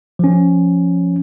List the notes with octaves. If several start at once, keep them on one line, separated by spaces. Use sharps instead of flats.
F3 C#4